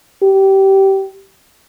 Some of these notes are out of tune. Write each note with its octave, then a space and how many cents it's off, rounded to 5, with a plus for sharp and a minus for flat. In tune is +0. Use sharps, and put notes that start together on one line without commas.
G4 -20